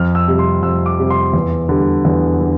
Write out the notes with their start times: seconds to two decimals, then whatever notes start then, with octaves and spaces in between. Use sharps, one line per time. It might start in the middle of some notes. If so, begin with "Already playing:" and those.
Already playing: F2 F6
0.15 E6
0.28 C3 G3
0.39 C6
0.62 F2 E6
0.86 D6
0.98 C3 G3
1.10 C6
1.33 E2
1.69 D3 G3
2.05 E2
2.41 D3